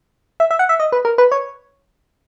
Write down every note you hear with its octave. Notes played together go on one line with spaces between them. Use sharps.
E5
E5
F#5
E5
D#5
B4
A#4
B4
C#5